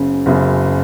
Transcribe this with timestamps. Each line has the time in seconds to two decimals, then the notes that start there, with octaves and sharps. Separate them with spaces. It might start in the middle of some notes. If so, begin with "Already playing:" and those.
Already playing: F#1 F#2 C#3
0.26 F#1 F#2 C#3